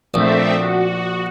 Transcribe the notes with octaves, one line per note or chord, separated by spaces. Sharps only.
A#1 A3 C4 E5
F#4